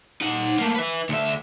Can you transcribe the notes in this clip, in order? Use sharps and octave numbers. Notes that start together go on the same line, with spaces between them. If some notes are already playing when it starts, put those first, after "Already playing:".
D#4 F#5
A3 A#3
B4 E5
D2 E5